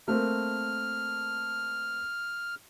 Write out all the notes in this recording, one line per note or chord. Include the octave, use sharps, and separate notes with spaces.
A3 A#3 C4 F6